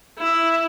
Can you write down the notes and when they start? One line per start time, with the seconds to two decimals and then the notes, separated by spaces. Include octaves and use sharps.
0.18 E4